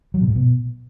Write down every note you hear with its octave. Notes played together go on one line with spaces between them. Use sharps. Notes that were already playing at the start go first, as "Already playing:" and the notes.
F#3
B2
A2
B2